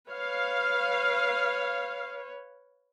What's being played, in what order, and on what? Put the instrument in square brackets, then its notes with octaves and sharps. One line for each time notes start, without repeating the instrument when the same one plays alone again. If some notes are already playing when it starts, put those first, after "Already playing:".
[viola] B4 C#5 [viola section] F5